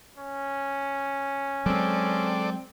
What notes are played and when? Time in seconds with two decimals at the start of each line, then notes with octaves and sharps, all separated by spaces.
0.18 C#4
1.66 F#3 G#3 C4 A4 D5